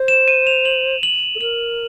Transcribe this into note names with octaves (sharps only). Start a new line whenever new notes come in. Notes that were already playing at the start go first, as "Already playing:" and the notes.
Already playing: C5
E7
D#7
F7
F#7
F#7
A4
A#4 F#7